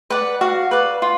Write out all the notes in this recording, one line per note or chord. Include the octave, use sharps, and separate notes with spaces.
B4 D5 F#5
F#4 F5
B4 D5
F4